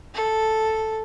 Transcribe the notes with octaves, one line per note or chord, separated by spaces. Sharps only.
A4